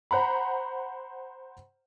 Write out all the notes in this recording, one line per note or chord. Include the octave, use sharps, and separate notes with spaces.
C5 F#5 A#5 B5